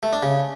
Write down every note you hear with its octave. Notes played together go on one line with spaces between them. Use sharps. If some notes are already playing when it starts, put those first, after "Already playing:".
A3
D4
C#3